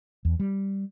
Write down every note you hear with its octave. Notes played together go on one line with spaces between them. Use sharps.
E2
G3